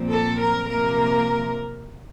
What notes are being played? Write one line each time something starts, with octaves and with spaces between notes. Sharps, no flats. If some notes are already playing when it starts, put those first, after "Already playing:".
Already playing: A#2 F3 C4
A4
A#4
C3 F3 A#3 A#4